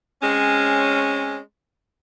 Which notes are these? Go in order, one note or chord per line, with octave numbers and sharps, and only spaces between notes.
G#3 C4 C#4